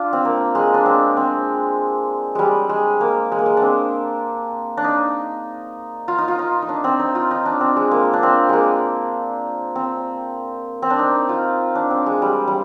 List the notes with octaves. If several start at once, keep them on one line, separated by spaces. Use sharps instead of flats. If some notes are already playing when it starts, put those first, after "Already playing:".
Already playing: D4 F4
C4
A#3
G#3
D4
C4
C4
G3 G#3
G#3
A#3
G#3
A#3
G#3
C4 D4
D4
D#4
F4
D#4
F4
D#4
D#4
D4
C4
D#4
F4
D#4
D4
C4
G#3
A#3
D4
C4
G#3 A#3
C4
C4
D4
D#4
F4
D4
C4
G#3
G3
G3